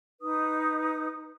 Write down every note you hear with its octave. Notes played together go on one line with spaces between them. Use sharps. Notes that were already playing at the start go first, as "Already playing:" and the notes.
D#4 B4 D#6